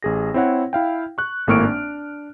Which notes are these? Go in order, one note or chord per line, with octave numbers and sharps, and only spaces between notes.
A1 G#4 A#6
C4 E4 C#5 F#5
E4 F5 G5
C#6 F#6
G#1 A2 A#3 C#6 F6 D7
D4